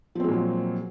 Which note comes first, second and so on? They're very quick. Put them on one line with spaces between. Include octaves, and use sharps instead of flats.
F3 C4 G#3 A#2 F#3